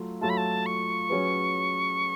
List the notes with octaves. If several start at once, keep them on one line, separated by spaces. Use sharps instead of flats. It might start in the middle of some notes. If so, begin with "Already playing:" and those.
Already playing: F#3 A3 F4
F#3 A3 F4 A5
B5
A5
C#6
F#3 C#4 G#4 B4